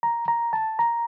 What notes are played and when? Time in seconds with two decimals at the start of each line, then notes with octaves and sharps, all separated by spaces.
0.03 A#5
0.28 A#5
0.53 A5
0.79 A#5